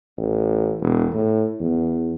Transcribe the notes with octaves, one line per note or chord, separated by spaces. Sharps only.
A1
E1
A2
E2